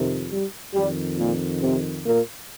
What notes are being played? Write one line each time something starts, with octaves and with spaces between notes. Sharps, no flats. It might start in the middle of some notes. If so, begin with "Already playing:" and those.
Already playing: F2 C3 D#3
G3
F2 D#3 G3
A#2 A#3
C3 C4
A#2 A#3